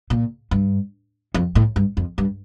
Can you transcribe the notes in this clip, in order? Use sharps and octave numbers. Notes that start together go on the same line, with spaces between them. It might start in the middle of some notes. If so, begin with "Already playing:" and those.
A#2
G2
F2
A2
G2
F2
G2